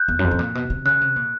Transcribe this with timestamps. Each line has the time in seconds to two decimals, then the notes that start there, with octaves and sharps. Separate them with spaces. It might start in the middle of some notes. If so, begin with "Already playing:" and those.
Already playing: F#6 G6
0.08 E2
0.19 F#2
0.24 F2
0.31 A2
0.39 A#2
0.55 B2
0.70 C3
0.85 C#3 F#6
1.01 C3
1.16 A#2